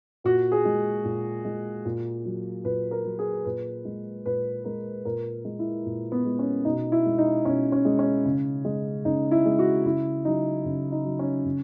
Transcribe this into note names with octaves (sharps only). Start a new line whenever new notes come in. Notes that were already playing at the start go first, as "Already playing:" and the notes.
A#2 F#4
G#4
G#3
A#2
G#3
A#2
F#3
A#2 B4
A#4
F#3
G#4
A#2 B4
G#3
A#2 B4
G#3 A#4
A#2 A#4
G#3
E4
A#2
B3
G#3
C#4
B2 D#4
E4
G#3
D#4
B2 C#4
C#4
G#3
C#4
C#3
G#3
C#3 D#4
E4
G#3
F#4
C#3 E4
F#3 D#4
C#3
D#4
F#3
C#4
C#3